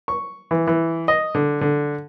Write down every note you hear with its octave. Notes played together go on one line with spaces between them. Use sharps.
C#6
E3
E3
D#5
D3
D3